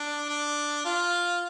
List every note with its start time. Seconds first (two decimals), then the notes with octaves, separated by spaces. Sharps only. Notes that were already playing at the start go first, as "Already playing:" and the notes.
Already playing: D4
0.29 D4
0.85 F4